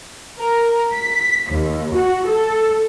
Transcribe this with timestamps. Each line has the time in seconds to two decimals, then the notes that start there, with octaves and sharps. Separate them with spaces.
0.39 A#4
0.93 B6
1.51 D#2
1.95 F#4
2.28 A4